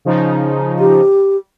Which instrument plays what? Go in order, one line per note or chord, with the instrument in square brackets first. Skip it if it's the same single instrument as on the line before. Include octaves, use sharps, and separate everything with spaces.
[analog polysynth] C#3 F3 D#4
[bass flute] G4